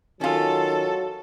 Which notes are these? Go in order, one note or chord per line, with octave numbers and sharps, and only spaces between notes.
D#3 F#3 C#4 F4 A4